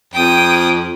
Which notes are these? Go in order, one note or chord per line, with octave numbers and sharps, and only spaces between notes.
F2 G5 D#6